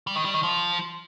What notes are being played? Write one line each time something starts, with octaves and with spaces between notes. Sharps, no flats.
G3
D#3
G3
D#3
F3